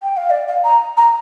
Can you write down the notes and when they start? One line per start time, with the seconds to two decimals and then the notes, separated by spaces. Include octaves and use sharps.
0.03 G5
0.17 F5
0.30 D5
0.48 F5
0.64 A#5
0.97 A#5